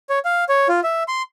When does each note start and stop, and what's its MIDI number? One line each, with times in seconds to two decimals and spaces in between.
0.09 0.19 73
0.25 0.44 77
0.49 0.68 73
0.69 0.80 65
0.83 1.03 76
1.08 1.22 84